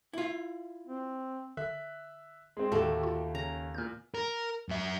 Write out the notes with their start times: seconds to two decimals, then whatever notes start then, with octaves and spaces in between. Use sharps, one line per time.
0.13 E4 F4
0.87 C4
1.57 D3 E5 F#6
2.57 G#3 C4
2.72 D#2 A2 D3 A3 F#4 G4 A4
3.03 F4
3.35 C#3 C#4 A#5
3.74 E2 A#2 F6 G6
4.15 A#4
4.69 F#2 E5